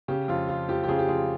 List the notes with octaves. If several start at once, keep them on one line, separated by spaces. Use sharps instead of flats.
C#3 G4
F2 F4
F3 F4
F2 G4
G4
C#3 F4 G#4
G4
F2 F4 G#4